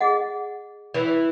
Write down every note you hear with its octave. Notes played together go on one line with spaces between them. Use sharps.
G#4 D#5 F#5
E3